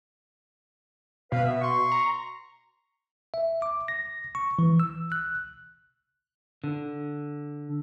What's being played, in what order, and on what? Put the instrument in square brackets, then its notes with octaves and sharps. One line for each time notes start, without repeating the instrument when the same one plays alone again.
[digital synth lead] B2 [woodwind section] B4 F5
[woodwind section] B3 E5
C6 C#6
[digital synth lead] A#5
[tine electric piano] E5
D6
A#6
C#6
E3
E6
F#6
[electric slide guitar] D3